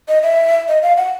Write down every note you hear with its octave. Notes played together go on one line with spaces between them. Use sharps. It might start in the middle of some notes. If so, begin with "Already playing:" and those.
D#5
E5
D#5
F5
F#5